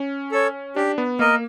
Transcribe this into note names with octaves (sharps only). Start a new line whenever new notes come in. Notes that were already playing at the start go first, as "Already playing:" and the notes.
Already playing: C#4
A4 C#5
D4 G4
B3
A#3 A#4 D#5